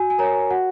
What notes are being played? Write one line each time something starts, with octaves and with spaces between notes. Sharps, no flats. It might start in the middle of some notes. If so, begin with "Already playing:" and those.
Already playing: F#4 G#5
G#5
A#4 C#5 A#5
F#4 F#5